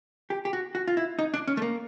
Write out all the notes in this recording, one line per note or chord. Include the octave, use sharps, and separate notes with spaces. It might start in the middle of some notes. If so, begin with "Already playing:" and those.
G4
G4
F#4
F#4
F4
E4
D#4
D4
C#4
A3
A#3